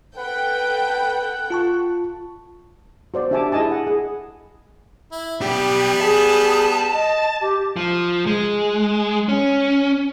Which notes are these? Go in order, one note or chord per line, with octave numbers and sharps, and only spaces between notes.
A4 B4 F#5 G5
F4 A5 C#6
F#4 C5 D5
D4 G4 E5 G#5 A5 D6
E4 G#4 D#5 G#5 A5
F#5
G#4
E4
B1 G3 B3 G4 G5
G#4 A5
D#5
G4
F3
G#3
C#4